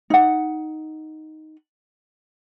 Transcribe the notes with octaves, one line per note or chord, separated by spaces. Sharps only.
D#4 F#5